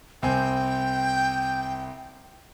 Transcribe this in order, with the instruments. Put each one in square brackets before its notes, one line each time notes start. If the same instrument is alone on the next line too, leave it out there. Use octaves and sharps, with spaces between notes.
[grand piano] C2 C4 G#5 [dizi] G5